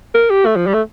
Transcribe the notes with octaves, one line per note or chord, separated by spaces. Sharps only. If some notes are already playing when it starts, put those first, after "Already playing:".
A#4
G4
A3
F3
G3
A3